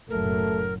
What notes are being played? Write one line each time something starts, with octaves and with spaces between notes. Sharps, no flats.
F#1 B1 F#2 A2 F#3 A3 A4 A#4